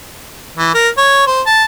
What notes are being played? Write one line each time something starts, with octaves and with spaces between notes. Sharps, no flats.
E3
A#4
C#5
C5
A5